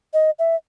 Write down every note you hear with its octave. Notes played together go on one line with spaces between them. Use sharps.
D#5
E5